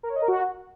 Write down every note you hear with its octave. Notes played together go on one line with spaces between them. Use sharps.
A#4
C#5
D#5
A#4
F#4